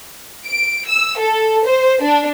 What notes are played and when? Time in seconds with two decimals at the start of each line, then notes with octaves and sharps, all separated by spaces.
0.46 D7
0.87 E6
1.19 A4
1.66 C5
2.02 D4